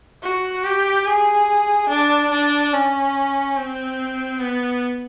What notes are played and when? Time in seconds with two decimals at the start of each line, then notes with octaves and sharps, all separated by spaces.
0.23 F#4
0.64 G4
1.05 G#4
1.89 D4
2.31 D4
2.73 C#4
3.56 C4
4.39 B3